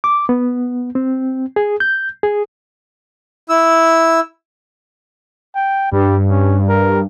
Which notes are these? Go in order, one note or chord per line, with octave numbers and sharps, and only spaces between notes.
D6
B3
C4
G#4
G6
G#4
E4 E6
G5
G2 G3
C#4
A#4